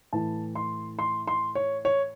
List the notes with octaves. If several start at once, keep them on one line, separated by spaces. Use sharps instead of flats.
A2 E3 A5
C6
C6
C6
C#5
C#5